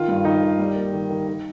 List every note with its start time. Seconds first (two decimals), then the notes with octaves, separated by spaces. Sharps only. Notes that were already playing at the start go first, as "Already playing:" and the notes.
Already playing: D#3 F4
0.08 G2
0.24 D#3 D#4
0.42 D#3
0.59 G3
0.76 A#3
0.93 D#3
1.10 D#3
1.28 D#3